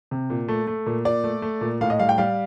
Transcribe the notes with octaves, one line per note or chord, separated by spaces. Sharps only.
C3
A#2
A3
A3
A#2
A#2 D5
A3
A3
A#2
A2 F5
D#5
G3 F5
G5
G3 F5